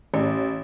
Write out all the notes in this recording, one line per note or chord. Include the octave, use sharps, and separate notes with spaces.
A1